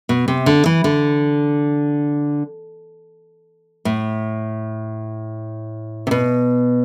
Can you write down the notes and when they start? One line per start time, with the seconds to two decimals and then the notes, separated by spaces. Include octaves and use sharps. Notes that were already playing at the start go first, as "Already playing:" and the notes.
0.09 B2
0.28 C3
0.46 D3
0.66 E3
0.84 D3
3.85 A2
6.07 C3
6.11 B2